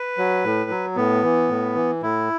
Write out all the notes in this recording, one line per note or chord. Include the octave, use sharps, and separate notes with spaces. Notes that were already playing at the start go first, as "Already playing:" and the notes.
Already playing: B4
F#3
A2
F#3
A2 B3
E3
A2
E3
A2 E4